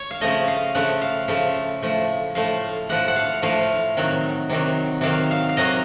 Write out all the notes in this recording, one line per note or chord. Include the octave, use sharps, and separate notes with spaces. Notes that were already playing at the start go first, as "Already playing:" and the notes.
Already playing: C#5
F5
C#3 F3 A3 D#5
F5
C#3 F3 A3 F#5
F5
C#3 F3 A3
A2 F3 A3
A2 F3 A3 F5
A2 F3 A3 F#5
F#5
F5
A2 F3 A3 F5
C3 D#3 F#3
C3 D#3 F#3
C3 D#3 F#3 F5
F5
F5
C3 D#3 F#3 D#5